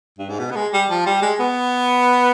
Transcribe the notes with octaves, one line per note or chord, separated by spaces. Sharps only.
G2
G#2
B2
B3
G#3
G3
F3
G3
G#3
B3